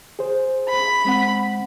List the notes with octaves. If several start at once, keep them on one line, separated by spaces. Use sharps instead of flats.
G#4 C5
B5
G#3 C4 F#5